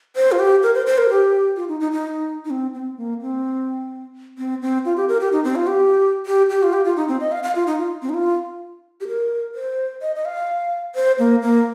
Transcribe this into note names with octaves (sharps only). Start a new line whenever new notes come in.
C5
F4
G4
A#4
C5
C5
A#4
G4
F4
D#4
D#4
D#4
D#4
C4
C4
A#3
C4
C4
C4
F4
G4
A#4
G4
D#4
C4
F4
G4
G4
G4
F4
G4
F4
D#4
C4
D#5
F5
F5
F4
D#4
F4
C4
D#4
F4
G4
A#4
C5
D#5
D#5
F5
C5
A#3
A#3